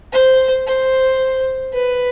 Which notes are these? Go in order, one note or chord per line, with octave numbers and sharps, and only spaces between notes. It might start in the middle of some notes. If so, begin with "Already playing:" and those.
C5
C5
B4